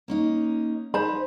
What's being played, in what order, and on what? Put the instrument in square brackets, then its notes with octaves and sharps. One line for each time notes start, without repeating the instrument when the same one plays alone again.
[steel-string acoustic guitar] A#3 C#4 D#4
[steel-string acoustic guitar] D#4 [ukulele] C5 B5